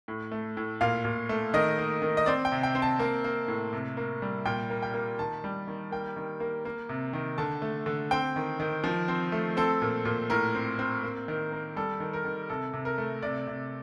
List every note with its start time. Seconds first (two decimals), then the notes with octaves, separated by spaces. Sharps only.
0.08 A2
0.31 A3
0.57 A2
0.81 A#2 F5
1.05 A#2
1.29 A3
1.54 D#3 D#5
1.78 A#3
2.02 D#3
2.17 D#5
2.26 C4 D5
2.45 G5
2.52 C3
2.63 G5
2.75 C4
2.82 A5
2.99 A#3
3.24 A#3
3.48 A2
3.73 C3
3.97 A#3
4.22 G3
4.45 A#2 G5
4.70 A#3
4.83 G5
4.94 A#3
5.19 D#3 A5
5.44 G3
5.67 D#3
5.91 A#3 G5
6.16 D#3
6.40 A#3
6.65 A#3
6.89 C3
7.13 D#3
7.38 D3 A5
7.62 A3
7.86 D3
8.11 C4 G5
8.36 D#3
8.60 D#3
8.84 F3
9.08 C4
9.32 A3
9.57 C4 A4
9.82 A#2
10.05 A#2
10.30 A2 A#4
10.55 C4
10.79 C4
11.03 A#3
11.28 D#3
11.52 A#3
11.76 G3 A4
12.00 D#3
12.13 A#4
12.25 D#3
12.50 C3 A4
12.73 C3
12.85 A#4
12.98 A3
13.23 C3 D5
13.47 C3